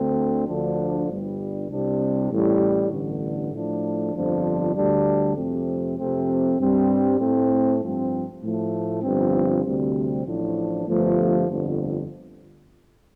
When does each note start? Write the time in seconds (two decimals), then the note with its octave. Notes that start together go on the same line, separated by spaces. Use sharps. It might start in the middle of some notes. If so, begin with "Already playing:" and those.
Already playing: D2 D3 A3 C4
0.48 D2 D3 F3 D4
1.08 G1 G2 G3
1.70 C2 C3 G3 D4
2.30 A1 A2 G3
2.91 A1 G2 D3
3.52 A2 F3 A3 D4
4.14 G1 F2 F3 D4
4.76 D2 D3 G3 D4
5.36 F2 C3 A3 C4
5.98 F2 C3 A3 C4
6.58 G2 G3 C4
7.20 A2 A3 C4
7.80 G2 F3 C4
8.42 A2 F3 A3
9.02 G1 G2 F3 C4
9.64 D2 C3 G3 C4
10.25 A1 A2 F3 D4
10.86 G1 G2 F3 A3
11.47 G1 F2 D3